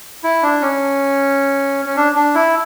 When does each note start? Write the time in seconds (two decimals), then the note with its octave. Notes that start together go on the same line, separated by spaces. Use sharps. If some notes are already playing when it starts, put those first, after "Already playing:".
0.24 E4
0.43 D4
0.62 C#4
1.85 C#4
1.97 D4
2.16 D4
2.35 E4